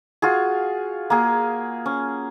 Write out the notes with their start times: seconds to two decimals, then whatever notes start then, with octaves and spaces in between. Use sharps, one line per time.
0.22 F4 F#4 G#4
1.10 A#3 G#4
1.86 C#4